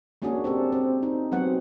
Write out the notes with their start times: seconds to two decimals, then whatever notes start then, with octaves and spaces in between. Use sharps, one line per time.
0.22 G#3 A#3 C#4 D4 F#4 G#4
0.44 C4 D4 G4 A4
0.72 C4
1.03 D#4
1.32 F#3 G#3 B3 C4 F#5